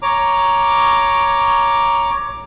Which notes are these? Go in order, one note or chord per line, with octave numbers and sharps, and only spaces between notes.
C#5 A#5 D6